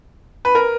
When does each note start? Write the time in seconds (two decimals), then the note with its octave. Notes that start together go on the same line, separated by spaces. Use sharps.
0.45 B4
0.55 A#4